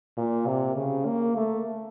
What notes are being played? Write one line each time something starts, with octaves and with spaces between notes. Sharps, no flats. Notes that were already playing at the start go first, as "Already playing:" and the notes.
A#2
C3
C#3
A#3
A3